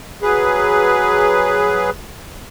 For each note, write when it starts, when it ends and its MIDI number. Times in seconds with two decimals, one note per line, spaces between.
0.22 1.90 54
0.22 1.90 68
0.22 1.90 71